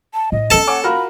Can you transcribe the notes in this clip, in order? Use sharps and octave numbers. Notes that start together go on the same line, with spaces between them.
A5
A2 D#5
A#3 C#4 A4 A5
C#5 F#5 G#5 D6
F4 F#4 A#4 B5